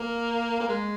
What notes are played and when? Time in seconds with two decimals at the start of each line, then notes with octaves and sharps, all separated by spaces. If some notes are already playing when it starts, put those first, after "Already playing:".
Already playing: A#3
0.60 A#3
0.68 G#3